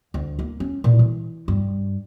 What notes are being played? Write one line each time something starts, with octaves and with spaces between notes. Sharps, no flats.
D2
A#3
C#4
A#2
E3
G2